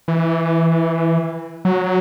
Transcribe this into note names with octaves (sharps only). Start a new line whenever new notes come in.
E3
F#3